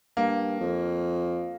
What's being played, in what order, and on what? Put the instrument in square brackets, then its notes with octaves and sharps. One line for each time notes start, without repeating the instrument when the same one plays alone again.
[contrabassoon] G2 [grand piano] A#3
[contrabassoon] F2